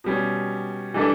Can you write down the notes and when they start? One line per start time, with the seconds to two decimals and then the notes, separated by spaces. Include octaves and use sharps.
0.04 B2 G3 C#4
0.94 E3 G3 D4 A4